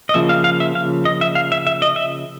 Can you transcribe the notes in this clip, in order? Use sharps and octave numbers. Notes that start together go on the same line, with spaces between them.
D#5
C#3 F3 A#3 E5
F5
F5
E5
F5
D#5
E5
F5
E5
E5
D#5
E5